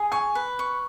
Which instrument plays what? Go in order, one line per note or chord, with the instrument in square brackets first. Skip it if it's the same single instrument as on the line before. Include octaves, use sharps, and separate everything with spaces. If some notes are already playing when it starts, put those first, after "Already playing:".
Already playing: [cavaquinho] G#4
[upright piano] G#5 [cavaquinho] C#6
[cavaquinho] B4
C#6